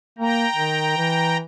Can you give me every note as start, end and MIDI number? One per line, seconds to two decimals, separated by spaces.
0.19 0.46 58
0.19 1.37 79
0.19 1.37 82
0.56 0.97 51
0.97 1.42 52